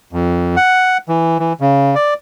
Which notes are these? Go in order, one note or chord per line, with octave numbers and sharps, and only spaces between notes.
F2
F#5
E3
E3
C#3
D5